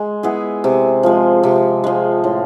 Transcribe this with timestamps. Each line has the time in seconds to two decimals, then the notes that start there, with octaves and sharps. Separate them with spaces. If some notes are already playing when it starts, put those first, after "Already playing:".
Already playing: G#3
0.23 B3 E4 G#4
0.64 C3
1.03 F3 G#3
1.43 C3
1.84 F3 G#3
2.24 A2